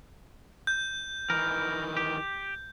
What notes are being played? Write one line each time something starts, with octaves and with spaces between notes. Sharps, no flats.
G6
D#3 E3 A#4
G4